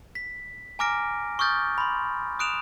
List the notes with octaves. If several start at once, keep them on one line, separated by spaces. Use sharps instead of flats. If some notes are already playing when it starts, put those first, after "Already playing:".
B6
G#5 A#5 D6 F6 A#6 D7
C#6 D#6 F6 G6 A6
B5 C6
D#6 F#6 D7 E7 F7